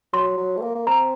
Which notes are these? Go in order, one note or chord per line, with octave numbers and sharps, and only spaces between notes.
F#3 C6
F#3
A3
A#3
A#3
C4 A#5